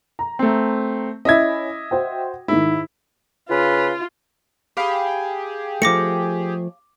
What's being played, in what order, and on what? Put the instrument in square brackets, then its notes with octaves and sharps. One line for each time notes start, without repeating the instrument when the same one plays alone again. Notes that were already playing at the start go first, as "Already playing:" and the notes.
[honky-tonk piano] A#5
[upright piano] A3 C4
[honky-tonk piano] C#4 E4 [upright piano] D#5 E5 G#6
[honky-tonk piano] F#4 C5 G5
[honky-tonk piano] G#2 D#3 [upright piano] E4
[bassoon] C#3 [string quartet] F4 [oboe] B4
[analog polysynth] G4 G#4 [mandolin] F5 B5
[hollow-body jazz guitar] F3 A3 [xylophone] D6 A#6 C#7